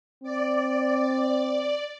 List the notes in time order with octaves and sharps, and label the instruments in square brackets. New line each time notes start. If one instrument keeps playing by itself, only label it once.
[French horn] C4 [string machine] D5